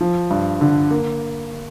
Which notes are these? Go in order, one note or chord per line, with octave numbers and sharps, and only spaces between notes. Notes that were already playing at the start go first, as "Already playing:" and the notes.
F3
G2
D3
A#3